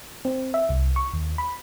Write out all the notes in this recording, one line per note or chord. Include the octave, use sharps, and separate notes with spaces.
C4
E5
C2
C#6
D#2
B5